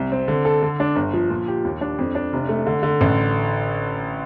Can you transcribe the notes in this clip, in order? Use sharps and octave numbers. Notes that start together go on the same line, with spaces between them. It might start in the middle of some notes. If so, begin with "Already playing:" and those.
Already playing: C2
C4
D3
A4
D3
D4
G1
F3
A#2
G4
D#2
D4
F2
D4
F1
A3
D3
D3
A1